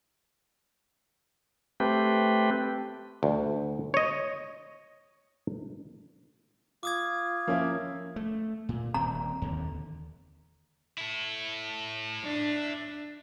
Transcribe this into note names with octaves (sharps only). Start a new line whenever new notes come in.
A3 C4 G4 B4
D2
C#5 D#5
F4 D6 D#6 G#6
F3 A#3 C#4 E4
A3
A#2
D#1 C4 A#5
D#2 D3
E4 A4
D4